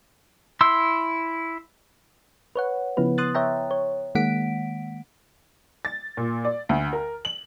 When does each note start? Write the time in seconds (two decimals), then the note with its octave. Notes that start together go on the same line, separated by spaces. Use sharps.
0.61 E4 C6 E6
2.56 B4 C#5 F#5
2.97 C#3 F3 B3 E4 B4
3.18 C6 D#6 F#6 A6
3.35 C#5 E5 G5 A#5
3.71 C#5
4.15 D#3 G#3 A#3 F#5 B6 D7
5.85 A6
6.17 A#2
6.45 D5
6.69 D2
6.93 A#4
7.25 F#7